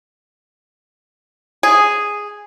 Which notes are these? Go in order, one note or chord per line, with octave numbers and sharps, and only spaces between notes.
G#4